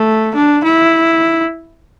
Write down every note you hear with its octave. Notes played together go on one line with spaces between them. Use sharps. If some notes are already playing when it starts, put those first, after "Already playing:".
Already playing: A3
D4
E4